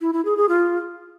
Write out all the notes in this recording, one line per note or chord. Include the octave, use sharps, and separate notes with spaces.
E4
E4
G#4
G#4
F4